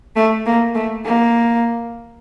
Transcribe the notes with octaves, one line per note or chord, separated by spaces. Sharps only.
A3
A#3
A3
A#3